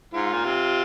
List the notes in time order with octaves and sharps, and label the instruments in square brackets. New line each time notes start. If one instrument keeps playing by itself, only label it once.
[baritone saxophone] G#2 [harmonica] F4
[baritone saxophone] A#2
C3